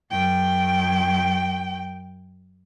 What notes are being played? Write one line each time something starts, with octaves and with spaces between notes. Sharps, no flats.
F#2 G5